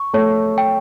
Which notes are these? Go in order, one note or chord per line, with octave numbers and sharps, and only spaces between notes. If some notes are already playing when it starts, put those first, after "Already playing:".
Already playing: C#6
A3 C#5
G5